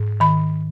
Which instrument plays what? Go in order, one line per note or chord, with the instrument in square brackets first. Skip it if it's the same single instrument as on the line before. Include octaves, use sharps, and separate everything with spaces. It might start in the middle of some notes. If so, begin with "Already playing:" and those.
Already playing: [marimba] G#2
D#3 B5